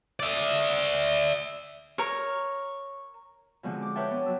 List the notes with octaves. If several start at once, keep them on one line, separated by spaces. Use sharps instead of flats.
D5 E5
A#4 C#5
B2 D3 F3 G#3 C4
D6
A#4 B4 C#5 E5 G5 A5
B3 D4
F#3 E6